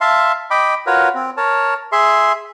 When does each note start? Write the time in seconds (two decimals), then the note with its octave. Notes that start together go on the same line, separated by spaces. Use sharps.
0.01 E5 F5 A5 C6
0.51 D#5 G5 B5 D6
0.87 F4 F#4 A#4 B4 C#5
1.15 C4
1.37 A#4 C#5 A5
1.92 G#4 E5 C6